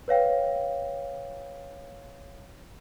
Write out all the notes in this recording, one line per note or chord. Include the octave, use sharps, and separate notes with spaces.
B4 C#5 F5 G5